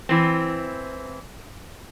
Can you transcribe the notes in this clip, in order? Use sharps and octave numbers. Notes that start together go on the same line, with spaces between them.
E3 C4